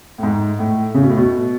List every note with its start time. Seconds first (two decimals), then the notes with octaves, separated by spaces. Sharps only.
0.18 A2
0.23 G#2
0.59 A2
0.94 C#3
1.03 B2
1.09 A2
1.17 B2